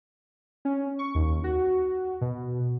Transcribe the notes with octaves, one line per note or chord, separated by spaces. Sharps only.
C#4
C#6
D#2
F#4
B2